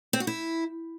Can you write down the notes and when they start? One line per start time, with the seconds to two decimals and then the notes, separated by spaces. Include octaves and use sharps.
0.13 C4
0.20 F#4
0.27 E4